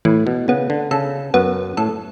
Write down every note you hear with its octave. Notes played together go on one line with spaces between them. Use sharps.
A2 E3
B2
C#3 B3
D3
C#3 A4
F#2 B3
A2 A4